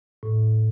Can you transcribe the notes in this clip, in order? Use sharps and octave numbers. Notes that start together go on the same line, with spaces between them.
A2